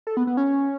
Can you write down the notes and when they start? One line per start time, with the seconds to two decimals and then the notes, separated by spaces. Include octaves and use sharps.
0.07 A4
0.17 B3
0.27 B3
0.37 C#4